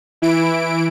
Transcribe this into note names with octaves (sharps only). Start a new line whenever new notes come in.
E3 E4 D7